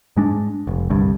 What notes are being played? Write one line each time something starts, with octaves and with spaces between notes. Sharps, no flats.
G#2 G#3 D4
F1
G1 C2 G2